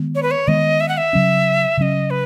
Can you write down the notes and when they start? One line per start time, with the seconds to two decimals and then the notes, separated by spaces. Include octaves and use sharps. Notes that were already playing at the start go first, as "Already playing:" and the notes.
Already playing: D#3 G#3 B3
0.15 C#5
0.23 B4
0.31 C#5
0.48 D#3 G#3 B3 D#5
0.80 E5
0.89 F#5
0.97 E5
1.13 C#3 F#3 C#4
1.77 C#3 F#3 C#4 D#5 E5
2.10 B4